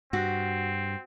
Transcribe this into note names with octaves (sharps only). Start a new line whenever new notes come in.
G2 C4 F#4